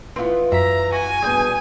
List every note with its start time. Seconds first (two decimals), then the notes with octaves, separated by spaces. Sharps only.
0.16 E3 B3 C4 F4
0.52 F#2 E5 A#5 B6
0.92 F#4 G#5
1.22 G2 B2 G#4 G6